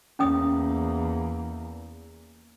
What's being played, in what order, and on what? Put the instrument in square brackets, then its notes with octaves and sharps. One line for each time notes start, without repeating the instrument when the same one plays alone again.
[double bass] E2 A#3 [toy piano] C#4 G5 D#6